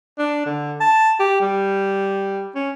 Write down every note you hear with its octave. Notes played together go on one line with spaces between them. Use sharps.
D4
D3
A5
G4
G3
C#4